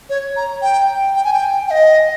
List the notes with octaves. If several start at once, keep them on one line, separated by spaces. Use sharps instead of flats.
C#5
A#5
G5
G5
G#5
G5
G5
D#5